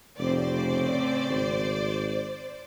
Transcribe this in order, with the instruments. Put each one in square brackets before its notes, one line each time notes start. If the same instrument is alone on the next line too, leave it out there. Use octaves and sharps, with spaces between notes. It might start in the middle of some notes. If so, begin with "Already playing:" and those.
[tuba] F1 [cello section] A2 C#3 C4 [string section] C5 D5
[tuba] G#1